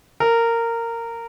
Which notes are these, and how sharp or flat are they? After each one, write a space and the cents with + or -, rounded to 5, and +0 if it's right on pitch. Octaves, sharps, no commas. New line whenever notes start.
A#4 -15